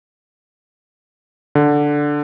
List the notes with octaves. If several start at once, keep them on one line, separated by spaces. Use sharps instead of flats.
D3